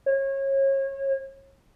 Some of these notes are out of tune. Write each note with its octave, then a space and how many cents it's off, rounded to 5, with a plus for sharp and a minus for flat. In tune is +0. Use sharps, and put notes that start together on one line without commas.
C#5 -30